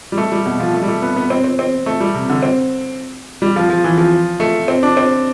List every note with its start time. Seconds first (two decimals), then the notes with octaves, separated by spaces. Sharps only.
0.12 G3
0.17 A3
0.32 G3
0.46 B2
0.60 F3
0.74 A3
0.83 G3
0.88 A3
1.02 B3
1.16 B3
1.30 C4
1.44 C4
1.59 C4
1.86 A3
2.00 G3
2.14 C3
2.29 D3
2.43 C4
3.42 G3
3.56 F3
3.70 F3
3.84 E3
3.98 F3
4.40 A3
4.68 C4
4.83 D4
4.97 C4